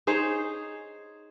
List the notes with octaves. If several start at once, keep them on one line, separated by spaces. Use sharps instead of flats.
D#4 G#4 C5 C#5